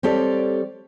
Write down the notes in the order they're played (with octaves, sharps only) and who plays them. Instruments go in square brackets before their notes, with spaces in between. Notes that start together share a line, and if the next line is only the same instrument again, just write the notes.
[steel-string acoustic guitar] G3 C4 G4 A4 C#5 D5